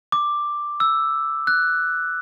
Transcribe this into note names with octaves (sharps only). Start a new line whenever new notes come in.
D6
E6
F#6